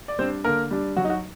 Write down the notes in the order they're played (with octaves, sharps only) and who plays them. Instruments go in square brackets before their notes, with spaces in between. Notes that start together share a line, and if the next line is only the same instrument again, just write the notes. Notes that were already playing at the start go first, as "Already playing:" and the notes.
[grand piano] D5
G3 C4 D4 C5
D3 A#3 A#4
G3 D4
F#3 F#4
D#4
F#4